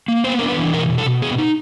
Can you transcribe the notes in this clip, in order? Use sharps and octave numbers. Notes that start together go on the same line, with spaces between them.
A#3
B3 C5
D4 A#4
B4
E3
B2 A#4
B2
A4
B2
B3 G#4
D#4